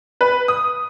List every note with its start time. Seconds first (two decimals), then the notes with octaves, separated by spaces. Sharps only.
0.21 B4
0.48 D#6